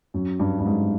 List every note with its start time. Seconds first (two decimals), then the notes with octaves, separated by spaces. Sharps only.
0.14 F#2
0.40 G2
0.59 G2
0.65 G#2